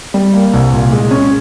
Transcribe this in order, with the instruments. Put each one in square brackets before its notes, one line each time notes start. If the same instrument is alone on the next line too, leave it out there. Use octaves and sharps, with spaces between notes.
[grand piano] G3
A#3
C2
A#2
G#3
C#4